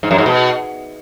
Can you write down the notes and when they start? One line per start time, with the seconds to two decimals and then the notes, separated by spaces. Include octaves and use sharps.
0.03 G#2
0.11 F#2
0.18 G#2
0.26 B2